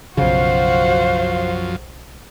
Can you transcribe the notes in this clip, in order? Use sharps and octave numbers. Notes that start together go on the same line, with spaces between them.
B1 F#2 C#3 F3 F#4 C5 F5